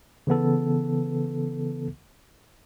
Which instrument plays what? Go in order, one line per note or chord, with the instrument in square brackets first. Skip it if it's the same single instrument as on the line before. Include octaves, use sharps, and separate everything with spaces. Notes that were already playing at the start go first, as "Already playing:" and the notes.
[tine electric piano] C#3 E3 B3 A4